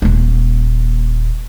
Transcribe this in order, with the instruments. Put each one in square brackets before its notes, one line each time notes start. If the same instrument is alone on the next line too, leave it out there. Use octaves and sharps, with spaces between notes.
[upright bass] D#1 A#3